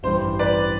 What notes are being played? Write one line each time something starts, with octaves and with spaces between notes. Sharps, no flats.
A1 G2 E3 G3 D4 C5
B4 D5